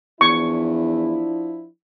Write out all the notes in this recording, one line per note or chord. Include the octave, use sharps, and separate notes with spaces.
E2 F3 D4 E4 C#6